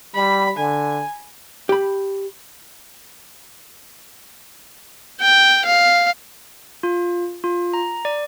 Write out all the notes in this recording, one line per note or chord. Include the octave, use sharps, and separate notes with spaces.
G3 B5
D3 G#5
G4 B5
G5
F5
F4
F4
A#5
D5